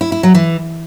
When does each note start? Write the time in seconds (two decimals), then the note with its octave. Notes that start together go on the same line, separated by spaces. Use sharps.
0.01 E4
0.12 E4
0.23 F#3
0.35 E3